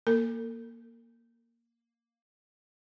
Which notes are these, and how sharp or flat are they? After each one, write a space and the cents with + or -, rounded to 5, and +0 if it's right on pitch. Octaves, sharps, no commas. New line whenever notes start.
A#3 +0 A4 +45